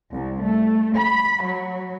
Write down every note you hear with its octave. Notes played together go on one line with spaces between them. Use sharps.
C2
A3
B5
F#3